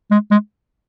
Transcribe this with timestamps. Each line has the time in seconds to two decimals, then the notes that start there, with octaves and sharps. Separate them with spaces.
0.11 G#3
0.31 G#3